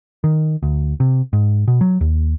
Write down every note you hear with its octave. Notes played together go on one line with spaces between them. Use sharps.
D#3
D2
C3
G#2
B2
F#3
D#2